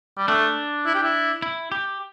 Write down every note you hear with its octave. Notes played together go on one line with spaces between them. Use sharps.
G3
A3 D4
E4
G4
E4
E4
G4